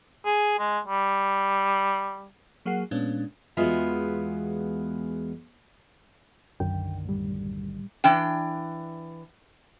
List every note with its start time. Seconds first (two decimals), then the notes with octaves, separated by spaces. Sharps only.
0.25 G#4
0.59 G#3
0.87 G3
2.65 F#3 A#3 G#4 F#5 C7
2.91 A#2 G#3 B3 C#4 D4
3.57 E2 G#3 B3 F4 F#4 E5
6.60 B1 F#2 D3 D#3 G5
7.05 A2 G3
8.04 E3 D4 G5